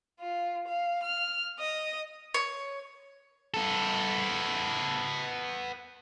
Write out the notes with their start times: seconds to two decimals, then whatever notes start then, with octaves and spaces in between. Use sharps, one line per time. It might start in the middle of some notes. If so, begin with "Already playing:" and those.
0.20 F4
0.68 F5
1.03 F6
1.59 D#5
2.34 C#5
3.54 B3 A4